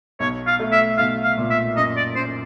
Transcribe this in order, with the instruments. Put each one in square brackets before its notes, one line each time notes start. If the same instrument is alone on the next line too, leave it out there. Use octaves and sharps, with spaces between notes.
[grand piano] B1 [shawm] C#5
[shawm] F5
[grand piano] A3
[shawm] E5
[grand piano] B1 [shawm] F5
[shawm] F5
[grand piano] A#2
[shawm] E5
[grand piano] F#2 [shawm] D#5
[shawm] D5
[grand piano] F#2 [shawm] C5